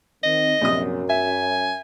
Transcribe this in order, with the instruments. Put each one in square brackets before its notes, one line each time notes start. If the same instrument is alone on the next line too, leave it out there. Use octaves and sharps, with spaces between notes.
[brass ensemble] D#3 C4 [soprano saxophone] D#5
[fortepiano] A#1 C3 D#6 [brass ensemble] F#2
[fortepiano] E5 [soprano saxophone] G#5